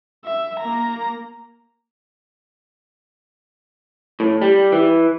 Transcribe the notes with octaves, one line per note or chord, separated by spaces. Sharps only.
E5
A#3 A#5
A2
G3
E3